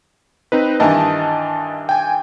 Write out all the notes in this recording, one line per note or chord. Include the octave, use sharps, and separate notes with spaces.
C4 D#4 B4
G2 D#3 E3 D#5 A5
G5 G#5